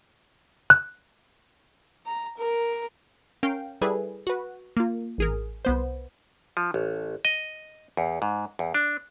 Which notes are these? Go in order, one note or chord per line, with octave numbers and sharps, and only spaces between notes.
F#6
A#5
A#4
C#4 A#4 F5 G5
G3 E4 G#4 A4 B4
F#4 B4
A#3 F4
A1 G#4 A#4
C2 B3 C5
F3
A1
D#5
E2
G#2
E2
D4